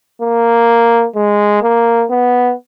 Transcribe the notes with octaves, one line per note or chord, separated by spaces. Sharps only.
A#3
G#3
A#3
B3